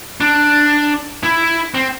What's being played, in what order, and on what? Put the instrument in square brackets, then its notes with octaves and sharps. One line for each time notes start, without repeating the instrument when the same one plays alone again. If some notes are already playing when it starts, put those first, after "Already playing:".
[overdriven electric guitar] D4
E4
C4